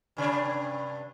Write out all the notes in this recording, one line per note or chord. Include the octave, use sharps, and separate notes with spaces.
G2 C3 D4